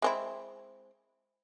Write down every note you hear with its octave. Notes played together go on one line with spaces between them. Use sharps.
G#3 C4 E4